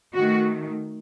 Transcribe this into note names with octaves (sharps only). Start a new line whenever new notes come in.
D#3 A3 F#4